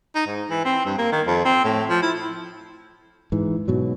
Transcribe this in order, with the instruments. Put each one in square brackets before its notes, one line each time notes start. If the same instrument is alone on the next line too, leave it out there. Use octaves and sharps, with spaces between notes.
[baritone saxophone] D#4
G#2
E3
C4
G2
A#3
D#3
F2
C4
A2
F3
E4
[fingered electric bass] G#2 E3
G#2 B2 F#3